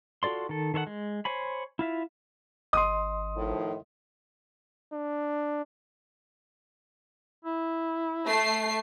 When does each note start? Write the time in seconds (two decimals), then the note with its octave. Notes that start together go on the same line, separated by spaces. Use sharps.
0.23 F4 F#4 A4 D5 C6
0.49 D#3 A4
0.74 D#3 A4 C#5 F#5
0.87 G#3
1.25 C5 C#5 G#5 B5
1.79 E4 F4 E5
2.73 G#1 D#5 C6 D#6
3.36 A2 D#3 F3
4.92 D4
7.45 E4
8.27 A3 C7